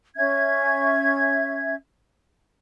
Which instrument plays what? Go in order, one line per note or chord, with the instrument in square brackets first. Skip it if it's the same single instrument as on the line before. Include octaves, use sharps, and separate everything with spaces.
[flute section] C#4 E5 G#6